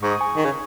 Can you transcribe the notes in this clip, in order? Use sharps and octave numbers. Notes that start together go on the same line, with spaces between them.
G#2 C#6
D#6
G#5 C#6
D#3
C#3